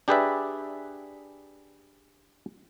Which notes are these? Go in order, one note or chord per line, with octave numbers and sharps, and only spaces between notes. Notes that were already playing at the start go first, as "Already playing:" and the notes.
D4 G4 G#4 B4 D5 E5